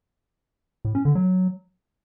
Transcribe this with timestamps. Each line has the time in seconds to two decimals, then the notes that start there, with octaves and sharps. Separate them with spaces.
0.85 A2
0.95 C#4
1.05 D3
1.15 F#3